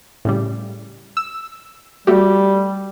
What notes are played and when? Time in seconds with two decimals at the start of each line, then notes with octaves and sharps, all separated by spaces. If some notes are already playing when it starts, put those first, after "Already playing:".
0.25 A2 C#3 G3
1.17 E6
2.07 G3 A3 F#4 G4